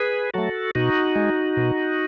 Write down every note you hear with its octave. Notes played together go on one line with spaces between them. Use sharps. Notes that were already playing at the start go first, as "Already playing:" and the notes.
Already playing: G#4 B4
F#3 A3 F#4 A4
B2 D#4 F#4
G#3
B2